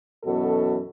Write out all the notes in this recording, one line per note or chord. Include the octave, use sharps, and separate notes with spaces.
F#2 B2 E3 F#4 A4